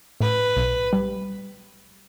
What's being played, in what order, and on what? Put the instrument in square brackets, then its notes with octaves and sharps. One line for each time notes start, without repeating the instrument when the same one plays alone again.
[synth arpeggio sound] A2 [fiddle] B4
[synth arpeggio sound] B1
G3